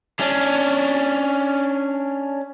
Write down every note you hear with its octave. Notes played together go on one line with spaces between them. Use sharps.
C#4 D4